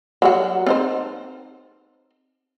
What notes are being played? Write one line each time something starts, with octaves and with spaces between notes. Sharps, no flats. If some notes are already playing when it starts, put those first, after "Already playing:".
F#3 G3 F#4
C4 D#4 C5